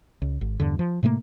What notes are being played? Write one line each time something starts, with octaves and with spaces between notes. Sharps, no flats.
C#2
G#1
E2 G2 D3
F3
A2 C3 A3 A#3